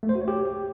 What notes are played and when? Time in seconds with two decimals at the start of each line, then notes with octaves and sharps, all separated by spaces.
0.03 A3
0.09 C5
0.15 F#4
0.22 C#5
0.28 G4